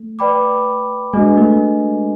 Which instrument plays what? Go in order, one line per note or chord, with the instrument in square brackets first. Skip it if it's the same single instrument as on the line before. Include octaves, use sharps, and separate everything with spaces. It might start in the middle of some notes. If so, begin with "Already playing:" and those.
Already playing: [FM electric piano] A3
[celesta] B4 D5 G5 B5 D6
[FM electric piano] G#3 [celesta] D4 F#4 B4 D#5 G#5
[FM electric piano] A3